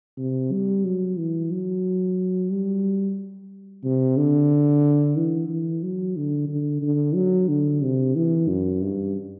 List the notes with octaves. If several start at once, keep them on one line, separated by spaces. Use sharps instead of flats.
C3
G3
F#3
E3
F#3
G3
C3
D3
E3
E3
F#3
D3
D3
D3
F#3
D3
C3
E3
F#2
G2